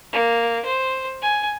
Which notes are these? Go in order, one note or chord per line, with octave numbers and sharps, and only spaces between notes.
A#3
C5
G#5